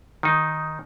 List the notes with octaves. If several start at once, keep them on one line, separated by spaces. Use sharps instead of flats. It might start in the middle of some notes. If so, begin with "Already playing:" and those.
D#3 D#4